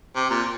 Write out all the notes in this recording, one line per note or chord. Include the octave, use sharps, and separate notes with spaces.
C3
A#2